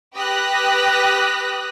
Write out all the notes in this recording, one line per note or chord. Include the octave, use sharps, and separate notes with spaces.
G4 B4 D#6 F#6 A#6 B6